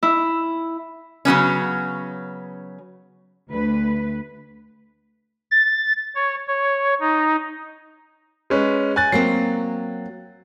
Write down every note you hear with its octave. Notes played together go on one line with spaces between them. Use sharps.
E4
C#3 F#3 B3 C#4
D2 B4
A6
C#5
C#5
D#4
G#3 C#4 B4
G#5 F#6 A6
F#3 A#3 C4 C7